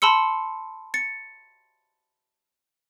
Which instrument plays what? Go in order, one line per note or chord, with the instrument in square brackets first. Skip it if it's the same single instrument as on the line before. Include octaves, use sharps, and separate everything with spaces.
[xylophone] A5 B5 C6 E6 C#7
A6 C#7